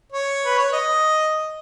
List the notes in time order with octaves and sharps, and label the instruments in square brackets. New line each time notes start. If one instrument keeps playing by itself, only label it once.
[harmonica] C#5
B4
C#5
D#5